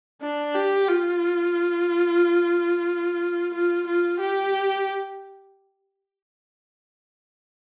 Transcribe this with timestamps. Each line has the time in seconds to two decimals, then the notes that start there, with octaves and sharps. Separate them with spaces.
0.22 D4
0.55 G4
0.88 F4
3.54 F4
3.87 F4
4.20 G4